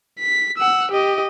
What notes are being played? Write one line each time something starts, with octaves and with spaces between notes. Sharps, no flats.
B6
F#5 E6
G4 D#5